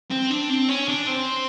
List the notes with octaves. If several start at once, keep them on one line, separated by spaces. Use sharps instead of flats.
C4
D4
C4
C#4
D4
C4